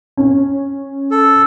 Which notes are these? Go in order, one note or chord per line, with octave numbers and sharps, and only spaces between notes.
C#4
A4